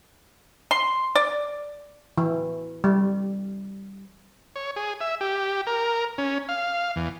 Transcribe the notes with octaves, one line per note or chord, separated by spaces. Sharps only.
C6
D5
E3
G3
C#5
G#4
E5
G4
A#4
C#4
F5
E2